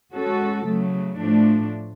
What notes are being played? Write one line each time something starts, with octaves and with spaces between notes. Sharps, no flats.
G#3 C#4 F#4 A4
C#3 F#3 A3
A2 F3 A3 D4